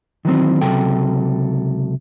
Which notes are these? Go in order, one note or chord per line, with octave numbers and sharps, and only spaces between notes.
D#3 E3 F#3 C4
C#2 C3 F#3 A4 G5